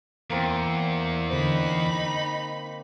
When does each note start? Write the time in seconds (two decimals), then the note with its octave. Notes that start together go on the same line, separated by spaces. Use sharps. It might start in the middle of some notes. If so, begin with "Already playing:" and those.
0.30 E2 A#3 C4
1.30 D3 D#4 C5 B5